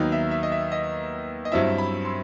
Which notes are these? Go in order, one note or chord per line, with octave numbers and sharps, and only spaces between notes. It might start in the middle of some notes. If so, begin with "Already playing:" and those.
Already playing: D#2 D#3 F#3 B3 D#4
E5
E5
D#5
E5
D#5
D#5
G2 F#3 C4 E4 E5
B5
C6